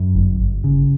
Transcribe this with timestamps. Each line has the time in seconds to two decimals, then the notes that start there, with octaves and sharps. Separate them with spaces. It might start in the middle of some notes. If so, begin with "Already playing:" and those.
Already playing: F#2
0.15 G1
0.40 G1
0.64 C#3